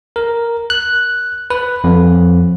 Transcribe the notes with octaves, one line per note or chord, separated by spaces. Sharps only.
A#4
F#6
B4
F2